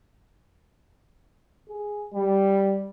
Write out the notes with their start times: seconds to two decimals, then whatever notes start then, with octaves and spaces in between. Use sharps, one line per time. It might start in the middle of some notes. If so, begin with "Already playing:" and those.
1.69 G#4
2.14 G3